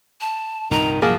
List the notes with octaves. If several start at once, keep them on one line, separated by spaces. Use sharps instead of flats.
A5
C2 G2 A#2 D#3 A#5
F3 F#3 A#3 G#4 A5